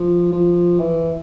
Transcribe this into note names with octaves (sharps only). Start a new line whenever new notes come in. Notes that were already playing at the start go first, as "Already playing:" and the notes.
Already playing: F3
F3
E3